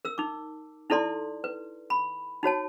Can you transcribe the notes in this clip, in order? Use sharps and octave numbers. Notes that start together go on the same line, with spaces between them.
A#4 E6
D#4 D6
D#4 E4 A4 D5 C6
B4
B5
D#4 F#4 C#5 A5